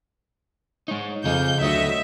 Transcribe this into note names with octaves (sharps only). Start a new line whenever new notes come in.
G#3 D#4 C#5
F2 C#3 G#4 D#5 F5 G6
D2 F#3 A3 C#5 D#5 E5